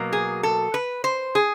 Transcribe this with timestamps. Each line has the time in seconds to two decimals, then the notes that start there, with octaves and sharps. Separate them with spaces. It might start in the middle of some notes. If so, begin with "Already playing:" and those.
Already playing: B2 F#3 A#3
0.13 G#4
0.43 A4
0.74 B4
1.04 C5
1.35 G#4